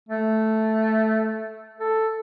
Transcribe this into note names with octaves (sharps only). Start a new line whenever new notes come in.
A3
A4